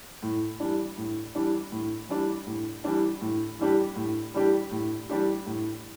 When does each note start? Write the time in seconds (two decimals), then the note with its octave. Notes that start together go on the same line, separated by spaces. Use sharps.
0.23 A2
0.60 E3 G3 D4
0.97 A2
1.35 E3 G3 D4
1.72 A2
2.09 E3 G3 D4
2.47 A2
2.84 E3 G3 D4
3.21 A2
3.59 E3 G3 D4 G4
3.96 A2
4.34 E3 G3 D4 G4
4.71 A2
5.09 E3 G3 D4 G4
5.46 A2